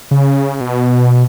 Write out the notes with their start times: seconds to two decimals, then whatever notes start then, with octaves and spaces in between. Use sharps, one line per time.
0.11 C#3
0.61 B2